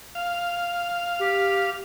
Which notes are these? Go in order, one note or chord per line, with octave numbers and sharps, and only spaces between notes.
F5
G4